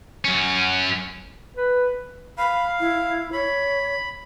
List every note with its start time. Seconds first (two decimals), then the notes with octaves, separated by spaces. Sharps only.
0.25 F#2 C#4
1.57 B4
2.38 F5 B5
2.80 E4
3.32 C#5 B5